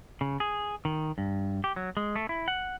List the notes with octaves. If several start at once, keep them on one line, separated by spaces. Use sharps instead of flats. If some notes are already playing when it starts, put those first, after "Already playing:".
C#3
G#4
D#3
G2
G4
F#3
G#3
A3
E4
F#5